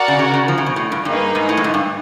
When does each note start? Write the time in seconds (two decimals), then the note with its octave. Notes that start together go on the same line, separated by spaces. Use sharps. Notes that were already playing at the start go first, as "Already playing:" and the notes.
Already playing: F#4 A#4 D5 F#5
0.08 C#3
0.19 C#3
0.34 C#3
0.48 F3
0.58 C#3
0.66 B2
0.76 A2
0.92 G2
1.05 G2 A#3 D#4 G#4 B4 D#5
1.35 G#2
1.49 A2
1.57 G2
1.64 G#2
1.74 G2